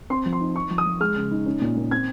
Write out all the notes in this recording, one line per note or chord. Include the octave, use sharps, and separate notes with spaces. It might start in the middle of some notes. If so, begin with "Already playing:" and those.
C4 C6
F3
C6
D#4
D#4 C#6
F3
D#6
F3
G#3 F6
C#3
D#4
C#4
A#2
A#2
C4 G#6